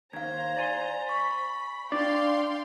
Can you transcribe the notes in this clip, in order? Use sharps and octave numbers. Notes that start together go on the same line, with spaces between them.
D#2 C5 F5 A#5 G#6
D5 G#5 C6
B5 C#6
D4 D5 F5 G5 C6